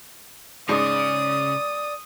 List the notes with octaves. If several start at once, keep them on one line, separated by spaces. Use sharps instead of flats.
G#2 C#3 D5 D#6